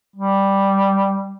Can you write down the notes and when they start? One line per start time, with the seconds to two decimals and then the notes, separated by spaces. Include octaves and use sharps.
0.16 G3